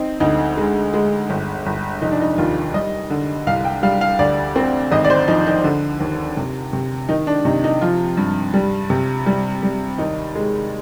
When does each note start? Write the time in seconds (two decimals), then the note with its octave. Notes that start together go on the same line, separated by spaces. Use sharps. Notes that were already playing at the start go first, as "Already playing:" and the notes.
Already playing: C4 D#4
0.20 D2 D#4
0.57 G#3
0.94 G#3
1.30 G1
1.66 G1
2.02 F1 D#4
2.12 D4
2.21 D#4
2.38 D#2 F4
2.74 G3 D#5
3.10 D3
3.47 C2 F5
3.65 G5
3.83 G3 F5
4.01 F5
4.19 D2 D5
4.56 C4
4.92 G#1 D#5
5.05 D5
5.10 C5
5.28 F3 D#4
5.47 D#4
5.64 D3
6.00 D#2
6.37 C3
6.73 C3
7.09 D#3 D#4
7.27 D4
7.45 C3 D#4
7.64 D#4
7.81 F3 F4
8.17 G2
8.54 G3
8.90 C3
9.26 G3
9.63 G3
9.98 D#2 D#4
10.35 G#3